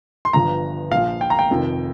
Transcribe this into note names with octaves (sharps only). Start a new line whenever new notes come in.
C6
G1 G2 F3 A#5
A#1 A#2 F3 F5
G5
A#5
G5
F1 F2 D#3